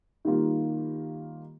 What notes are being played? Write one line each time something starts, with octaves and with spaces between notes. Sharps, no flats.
D#3 G3 A#3 F4